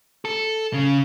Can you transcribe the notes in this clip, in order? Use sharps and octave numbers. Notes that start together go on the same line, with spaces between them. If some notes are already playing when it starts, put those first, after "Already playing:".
A4
C#3